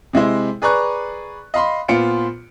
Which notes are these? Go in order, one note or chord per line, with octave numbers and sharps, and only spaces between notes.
C3 G#3 E4 C5
G#4 B4 D5 A#5 C#6 F#6
D#5 F5 B5 C6
A#2 B3 F4 C5 C#7 D7